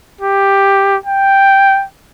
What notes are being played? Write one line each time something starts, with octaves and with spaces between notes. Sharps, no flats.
G4
G5